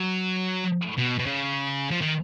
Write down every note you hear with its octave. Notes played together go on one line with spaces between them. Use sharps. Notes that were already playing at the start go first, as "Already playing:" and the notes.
Already playing: F#3
B2
B2
C#3
F3
D#3